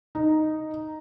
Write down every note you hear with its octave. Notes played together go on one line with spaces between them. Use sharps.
D#4